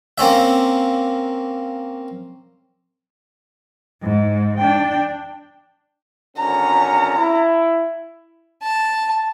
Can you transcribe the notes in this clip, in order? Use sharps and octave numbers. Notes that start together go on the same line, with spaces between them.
A#3 C4 C#4 E5
G#2
D4 G5
G#1 D3 C#4 A#5
E4
A5